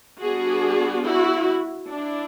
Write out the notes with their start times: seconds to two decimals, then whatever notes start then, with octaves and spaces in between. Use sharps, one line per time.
0.21 G3 B3 D4 F#4 G#4
1.05 E4 F#4
1.88 D4 E4